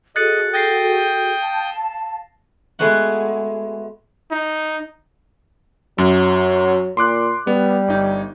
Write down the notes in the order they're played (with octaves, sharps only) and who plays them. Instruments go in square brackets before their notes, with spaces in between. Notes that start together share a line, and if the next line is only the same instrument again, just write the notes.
[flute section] F#4 G#4 A4 [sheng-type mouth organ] D#5 [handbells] F#6 A6 C#7
[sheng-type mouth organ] G5 D#6 G6 [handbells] A6 A#6 C7
[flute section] F5 A5
[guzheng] G#3 A3 B3 F#4 F#5
[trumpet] D#4
[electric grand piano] F#2 [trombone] F#3
[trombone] A#2 [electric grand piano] C6 D6 F#6
[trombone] G3 [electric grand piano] B3
[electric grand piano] G1 D#4